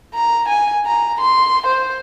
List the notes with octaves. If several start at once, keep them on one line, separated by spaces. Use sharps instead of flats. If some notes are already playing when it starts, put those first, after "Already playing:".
A#5
G#5
A#5
C6
C5